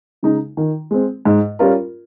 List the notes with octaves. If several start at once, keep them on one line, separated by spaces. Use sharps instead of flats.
C#3 G#3 D#4
D#3
G#3 C4
G#2
G3 C#4 F4 A#4